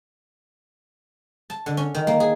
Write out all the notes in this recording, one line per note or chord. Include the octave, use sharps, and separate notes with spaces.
A5
D3
C#4
D#3
A#3
G#4